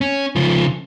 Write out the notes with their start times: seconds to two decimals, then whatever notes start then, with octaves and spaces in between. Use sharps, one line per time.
0.01 C#4
0.36 C#3 F3